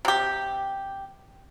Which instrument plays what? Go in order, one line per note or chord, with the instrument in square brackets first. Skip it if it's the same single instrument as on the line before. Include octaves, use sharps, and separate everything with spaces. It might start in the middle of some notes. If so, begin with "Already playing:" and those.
[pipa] C3 G4